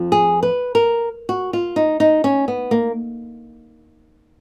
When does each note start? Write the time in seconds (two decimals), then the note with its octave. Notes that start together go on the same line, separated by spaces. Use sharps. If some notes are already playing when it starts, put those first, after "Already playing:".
Already playing: F2 F3
0.12 G#4
0.43 B4
0.75 A#4
1.29 F#4
1.53 F4
1.76 D#4
2.00 D#4
2.24 C#4
2.48 B3
2.71 A#3